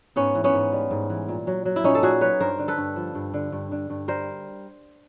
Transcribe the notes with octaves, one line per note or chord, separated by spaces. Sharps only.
G#2 B3 C#4
E3
B3 C#4
G#2
G3
G#2
E3
A#2
F#3
F#3
E4
A#2 C#4 D#4
A4
A#2 F#4 G#4
F#3 B4 C#5
G2 A#4 C5
D3
A4 B4
G2
F3
G2
D3
G2
D3
G2
G3 A#4 C5